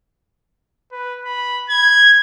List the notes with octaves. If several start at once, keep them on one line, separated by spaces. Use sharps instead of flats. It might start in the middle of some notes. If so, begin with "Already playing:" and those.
B4
B5
G#6